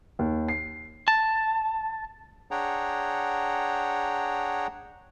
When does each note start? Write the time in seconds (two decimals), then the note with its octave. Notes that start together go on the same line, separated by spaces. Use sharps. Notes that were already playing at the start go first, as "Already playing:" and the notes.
0.19 D#2
0.48 C7
1.08 A5
2.51 D4 G#4 C#5 F#5 G5 A#5